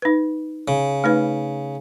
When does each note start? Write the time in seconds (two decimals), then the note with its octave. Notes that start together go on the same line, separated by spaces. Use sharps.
0.02 D#4 B4
0.68 C#3
1.04 A3 D#4 B4